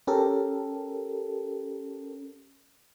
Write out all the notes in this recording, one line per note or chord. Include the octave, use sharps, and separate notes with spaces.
C#4 G4 A4 A#4